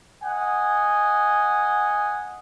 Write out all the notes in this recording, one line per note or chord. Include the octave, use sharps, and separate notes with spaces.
D#5 F#5 G#5